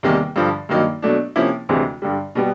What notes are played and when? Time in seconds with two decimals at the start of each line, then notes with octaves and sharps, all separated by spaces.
0.03 E2 C3 D#3 G3 A#3
0.36 G2 D3 F3
0.69 G2 D#3 F#3 A#3 D#4
1.02 B2 F#3 A3 D4
1.36 C3 F3 A#3 C#4 E4
1.69 D2 C3 E3 G#3 C4
2.02 G2 D3 G3
2.35 B2 G3 B3